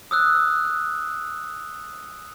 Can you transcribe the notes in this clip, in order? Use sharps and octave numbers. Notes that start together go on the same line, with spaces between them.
D#6 E6 F#6